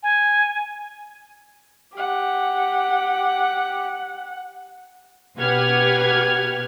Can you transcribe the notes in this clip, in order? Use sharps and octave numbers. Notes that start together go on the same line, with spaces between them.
G#5
G4 F#5
B2 G4 B4 F#5 F6 G#6